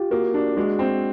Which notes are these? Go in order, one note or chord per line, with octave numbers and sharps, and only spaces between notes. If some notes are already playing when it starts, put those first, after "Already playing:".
Already playing: F4 G4
A#3 F#4
D4
G#3 F#4
C4